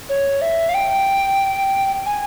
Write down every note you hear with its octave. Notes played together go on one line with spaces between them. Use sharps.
C#5
E5
F5
G5
G#5